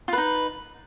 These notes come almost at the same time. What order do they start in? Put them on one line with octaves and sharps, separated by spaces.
F4 B4 D#4